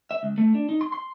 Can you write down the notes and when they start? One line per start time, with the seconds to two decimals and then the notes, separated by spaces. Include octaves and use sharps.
0.11 E5
0.23 C#2
0.38 A3
0.55 D4
0.69 D#4
0.81 C6
0.92 C6